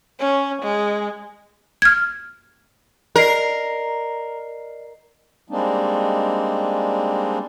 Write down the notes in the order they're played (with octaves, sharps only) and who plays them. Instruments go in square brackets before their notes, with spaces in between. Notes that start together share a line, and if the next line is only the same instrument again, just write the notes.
[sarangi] C#4
G#3
[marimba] F6 G#6
[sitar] A#4 [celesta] D5 D#5 C7
[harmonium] G3 G#3 A#3 C4 D4 D#4